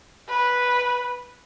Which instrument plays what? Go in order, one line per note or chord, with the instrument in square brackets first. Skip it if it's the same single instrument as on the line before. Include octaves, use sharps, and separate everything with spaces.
[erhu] B4